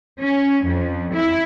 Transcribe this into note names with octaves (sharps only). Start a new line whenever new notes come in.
C#4
F2
E4